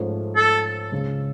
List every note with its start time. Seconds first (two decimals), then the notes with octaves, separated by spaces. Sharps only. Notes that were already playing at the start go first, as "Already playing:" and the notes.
Already playing: G#2 F3 A3 C#4
0.36 A4
0.91 C#2 C#3 G#3